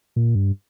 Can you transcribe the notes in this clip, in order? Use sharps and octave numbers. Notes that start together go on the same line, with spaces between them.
A#2
G2